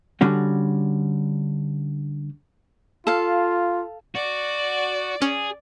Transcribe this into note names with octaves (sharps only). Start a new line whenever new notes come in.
D3 G3 C#4 F#4
F4 A4 F5
F#4 D5
C#4 G#4